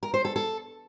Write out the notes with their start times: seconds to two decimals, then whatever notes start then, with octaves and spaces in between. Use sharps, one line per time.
0.03 A#4
0.14 C5
0.25 A4
0.36 A4